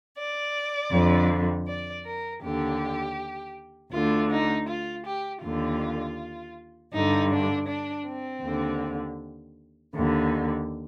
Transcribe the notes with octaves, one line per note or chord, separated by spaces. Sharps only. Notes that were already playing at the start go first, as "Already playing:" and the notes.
D5
F2 D3
D5
A#4
D#2 D3 G4
D2 D3 F4
D#4
F4
G4
D#2 D3 F4
G2 D3 D#4
D4
D4
C4
D#2 D3
D#2 D3